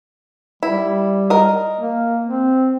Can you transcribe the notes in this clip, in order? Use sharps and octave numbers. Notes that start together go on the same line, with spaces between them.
G3 E4
A#4 D#5
A#3
C4